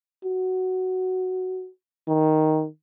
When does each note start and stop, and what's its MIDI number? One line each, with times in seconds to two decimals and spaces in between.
0.24 1.69 66
2.08 2.66 51